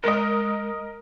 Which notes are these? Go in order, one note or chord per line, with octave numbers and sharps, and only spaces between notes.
G#3 A#4 D#5